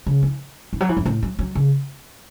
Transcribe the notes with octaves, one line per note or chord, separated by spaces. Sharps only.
C#3
E3
E3
F#3
E3
F#2
A2
F#3
F#3
C#3